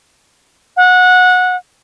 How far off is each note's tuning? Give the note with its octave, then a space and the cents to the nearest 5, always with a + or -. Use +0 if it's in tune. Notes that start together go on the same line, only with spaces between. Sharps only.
F#5 -20